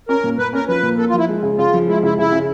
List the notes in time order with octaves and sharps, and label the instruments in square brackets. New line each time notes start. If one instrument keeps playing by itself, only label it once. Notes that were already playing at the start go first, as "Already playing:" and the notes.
[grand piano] C#4 [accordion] A#4
[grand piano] A#2
[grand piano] A#2 [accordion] B4
[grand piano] C#4 [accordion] A#4
[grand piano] F3 [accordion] B4
[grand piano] A#2
[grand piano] A#3 [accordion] A4
[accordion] F4
[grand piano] F3 [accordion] E4
[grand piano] G#3
C#3
[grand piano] C#3 [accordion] F4
[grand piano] F3
[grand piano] G#3 [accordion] E4
[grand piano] C#3 [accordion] E4
[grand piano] C#3 [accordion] E4
[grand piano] C#3